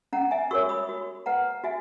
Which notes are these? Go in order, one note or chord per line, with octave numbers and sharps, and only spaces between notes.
C#4 F#5 A#5
E5 G#5
F#4 A#4 C#5 C#6 E6
B5 D#6
F#4
B4 F#5 A#5
F#4 E5 G#5